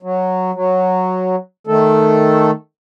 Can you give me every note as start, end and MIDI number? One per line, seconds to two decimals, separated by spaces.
0.03 0.51 54
0.54 1.36 54
1.67 2.51 51
1.67 2.51 57
1.67 2.51 69